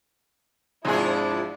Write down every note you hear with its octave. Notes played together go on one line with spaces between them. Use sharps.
G#1 G#2 C3 F3 D4 E4 G#4